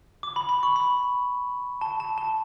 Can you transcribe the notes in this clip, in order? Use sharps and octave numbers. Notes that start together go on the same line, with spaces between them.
D6
B5
B5
C#6
B5
A5
A5
A5